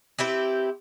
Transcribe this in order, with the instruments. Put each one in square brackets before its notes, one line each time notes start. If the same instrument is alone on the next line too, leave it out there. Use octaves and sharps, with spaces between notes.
[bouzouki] C4 E4 G4 B4